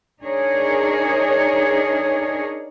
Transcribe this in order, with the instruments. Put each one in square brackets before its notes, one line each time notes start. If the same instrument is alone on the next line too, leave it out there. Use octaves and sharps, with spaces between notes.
[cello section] D4 D#4 G#4 A#4 C#5